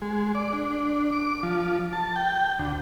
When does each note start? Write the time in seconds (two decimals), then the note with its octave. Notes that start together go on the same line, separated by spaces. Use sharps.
0.02 G#3
0.35 D5
0.53 D4
1.12 D6
1.43 F3
1.93 A5
2.16 G5
2.59 D2